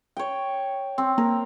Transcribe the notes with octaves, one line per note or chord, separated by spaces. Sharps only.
C#5 G5
C4
A#3 A#4